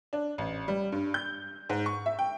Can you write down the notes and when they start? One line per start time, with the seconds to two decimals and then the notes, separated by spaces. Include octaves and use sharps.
0.13 D4
0.38 A1
0.68 G3
0.92 G2
1.14 G6
1.69 G#2
1.86 C#6
2.06 E5
2.19 G5